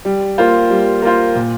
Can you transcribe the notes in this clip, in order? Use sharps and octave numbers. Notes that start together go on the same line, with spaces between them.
G3
A#3 F4 C5
G3
A#3 F4 C5
A#2